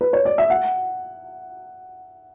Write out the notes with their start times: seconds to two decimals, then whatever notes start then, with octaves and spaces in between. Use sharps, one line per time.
0.01 B4
0.13 C#5
0.25 D5
0.38 E5
0.50 F#5